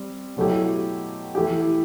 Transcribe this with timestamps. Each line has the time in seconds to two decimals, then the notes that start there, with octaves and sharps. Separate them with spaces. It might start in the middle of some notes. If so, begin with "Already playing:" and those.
Already playing: G3 C4
0.37 B2 F#3 A3 E4 G4
1.35 E3 A3 E4 G4